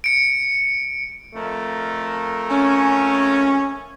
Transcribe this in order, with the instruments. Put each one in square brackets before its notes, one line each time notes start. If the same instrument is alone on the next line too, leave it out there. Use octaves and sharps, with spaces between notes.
[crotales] C#7 D7
[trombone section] F2 A3 A#4
[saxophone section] C#4